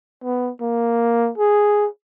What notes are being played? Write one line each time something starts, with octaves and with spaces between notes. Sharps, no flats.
B3
A#3
G#4